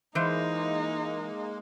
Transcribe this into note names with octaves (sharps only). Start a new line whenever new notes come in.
E3 G#3 A#3 D#4 C5